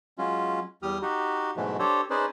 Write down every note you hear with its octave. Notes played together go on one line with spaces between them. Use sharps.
F#3 G#3 C#4 F4
E2 G3 G4 D#6 F6
D#4 F#4 G4
G#2 B2 E3 F#3 G#3 A3
D4 G4 A4 C5 C#5
C#4 D#4 G#4 B4 C5 D5